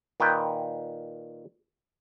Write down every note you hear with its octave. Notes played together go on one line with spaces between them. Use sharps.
A#2 D#3 B4 G5